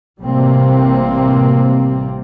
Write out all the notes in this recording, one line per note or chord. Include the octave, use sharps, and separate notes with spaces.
A1 C3 G3 A#3 C4